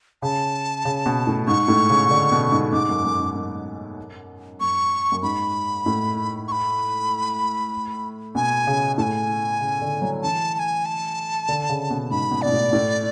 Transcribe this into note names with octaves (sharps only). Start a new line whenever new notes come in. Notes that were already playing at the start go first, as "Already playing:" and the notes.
C#3 A5
C#3
B2
A2
G#2 C#6
A2
C#3
C#3
D3
B2
G#2
G#2 D6
F#2
F#2
G#2
F#2
F#2 C#6
F#2
G#2 B5
A2
C#6
B5
B2 G#5
C#3
A2 G#5 A5
C#3
D3
F#3
E3 A5
A5
G#5
A5
D3
C#3
B2
G#2 B5
B2
B2 D5
A2
A2